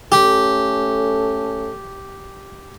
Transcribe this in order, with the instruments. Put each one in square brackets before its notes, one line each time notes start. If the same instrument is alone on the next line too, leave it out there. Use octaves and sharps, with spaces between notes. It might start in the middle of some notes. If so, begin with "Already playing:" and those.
[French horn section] A3 C#4 A4 [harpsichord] G4